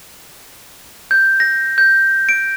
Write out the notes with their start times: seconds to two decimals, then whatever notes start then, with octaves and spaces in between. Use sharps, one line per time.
1.11 G6
1.40 A#6
1.78 G6
2.29 D7